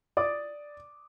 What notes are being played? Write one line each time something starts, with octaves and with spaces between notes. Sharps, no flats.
D5 D6 D#6